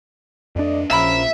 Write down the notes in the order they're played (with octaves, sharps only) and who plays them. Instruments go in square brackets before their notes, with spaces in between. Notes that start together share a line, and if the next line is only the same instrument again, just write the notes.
[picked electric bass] F2 D4 [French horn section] A3 D5 D#5
[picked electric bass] A#1 [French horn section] F3 C#4 [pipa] F#3 A#4 B5 [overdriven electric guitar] E5